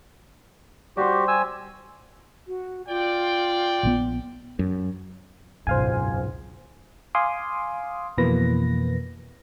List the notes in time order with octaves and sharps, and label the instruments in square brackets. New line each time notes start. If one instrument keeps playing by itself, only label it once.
[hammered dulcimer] G3 C5 [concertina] F#4 G4
[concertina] G#5 E6
[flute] F#4
[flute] F4 [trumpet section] D5 G5
[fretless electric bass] A#1 C#3 B3
F#2
[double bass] G#1 C#2 [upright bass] F#2 B2 [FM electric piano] C5 F5 G#5
[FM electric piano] F5 G#5 C6 D6 D#6
F2 B2 E3 A#3 B4 A#6